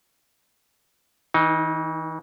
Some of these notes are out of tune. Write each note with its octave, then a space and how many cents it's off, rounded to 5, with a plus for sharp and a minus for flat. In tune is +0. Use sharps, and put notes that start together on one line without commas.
E3 -40 D#4 +0